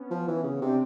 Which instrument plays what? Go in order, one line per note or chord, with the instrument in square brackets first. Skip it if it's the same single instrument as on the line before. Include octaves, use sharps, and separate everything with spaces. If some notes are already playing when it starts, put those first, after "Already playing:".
Already playing: [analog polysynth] B3 C#4
[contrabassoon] F3
E3
C#3
[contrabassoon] C3 [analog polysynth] C4 D4